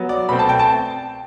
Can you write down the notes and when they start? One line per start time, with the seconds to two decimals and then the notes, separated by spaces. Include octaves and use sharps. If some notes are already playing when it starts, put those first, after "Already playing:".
Already playing: F#3 B3
0.09 D5
0.29 B2 A3 C4 B5
0.39 A5
0.49 G5
0.59 A5